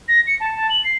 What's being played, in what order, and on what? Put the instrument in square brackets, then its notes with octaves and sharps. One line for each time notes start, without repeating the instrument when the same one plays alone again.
[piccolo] A#6
C#7
A5
A5
F#7
C7